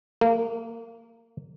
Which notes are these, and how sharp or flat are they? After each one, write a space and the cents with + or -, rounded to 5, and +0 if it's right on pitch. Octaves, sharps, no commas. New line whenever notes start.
A#3 -25